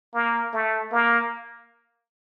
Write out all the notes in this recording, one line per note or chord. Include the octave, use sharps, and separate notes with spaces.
A#3
A3
A#3